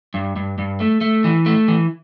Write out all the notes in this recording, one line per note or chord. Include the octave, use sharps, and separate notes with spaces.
G2
G2
G2
A3
A3
E3
A3
E3